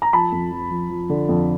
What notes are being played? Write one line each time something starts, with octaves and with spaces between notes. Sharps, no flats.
A#5
F3 A5 B5
F2
F3
F3
F3
D3
F2